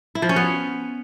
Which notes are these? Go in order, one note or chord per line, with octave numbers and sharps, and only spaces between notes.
E4
F3
C#4
B3